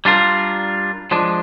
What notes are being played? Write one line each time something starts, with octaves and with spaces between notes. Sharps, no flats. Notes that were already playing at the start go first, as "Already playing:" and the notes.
G3 D4 F4 A#4
F3 G#3 D4